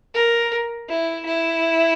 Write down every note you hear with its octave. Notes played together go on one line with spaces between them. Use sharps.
A#4
E4
E4